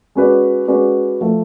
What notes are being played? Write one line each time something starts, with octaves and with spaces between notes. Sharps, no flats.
G#3 C#4 F#4 B4 D5
G#3 C#4 F#4 B4 D5
F3 A3